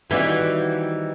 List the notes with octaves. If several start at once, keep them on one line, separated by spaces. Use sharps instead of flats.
D#3 E3 G3 C4 D#4 F#4